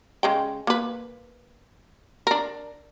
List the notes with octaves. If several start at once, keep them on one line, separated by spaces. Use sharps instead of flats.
C#3 G#3 G5
A#3 B4
D4 A#4